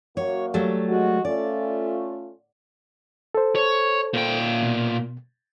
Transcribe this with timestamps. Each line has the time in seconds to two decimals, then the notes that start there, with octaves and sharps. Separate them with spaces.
0.17 F#2 A#3 F#4 C#5
0.54 F#3 G3 A3
0.89 G#3 F#4
1.25 A3 C#4 F4 D5
3.35 A4 C5
3.55 C#5
4.13 A#2 G5
4.63 B2